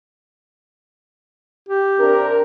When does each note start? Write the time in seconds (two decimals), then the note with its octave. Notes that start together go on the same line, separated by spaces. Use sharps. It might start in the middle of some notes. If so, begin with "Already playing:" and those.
1.68 G4
1.99 C3 D4 A#4